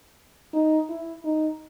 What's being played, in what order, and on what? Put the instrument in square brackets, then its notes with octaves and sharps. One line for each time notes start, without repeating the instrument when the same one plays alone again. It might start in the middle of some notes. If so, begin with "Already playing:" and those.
[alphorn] D#4
E4
D#4